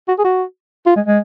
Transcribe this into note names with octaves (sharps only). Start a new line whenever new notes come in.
F#4
G#4
F#4
F4
G#3
G#3